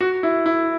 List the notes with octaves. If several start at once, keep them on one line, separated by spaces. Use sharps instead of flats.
F#4
E4
E4